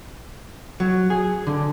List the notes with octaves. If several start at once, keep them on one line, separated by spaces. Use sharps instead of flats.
F#3
G#4
D3